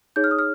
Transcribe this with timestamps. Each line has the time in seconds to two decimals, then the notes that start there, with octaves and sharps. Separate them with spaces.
0.16 D#4 G#4 C#5 G6
0.24 F6
0.31 D#6
0.39 F6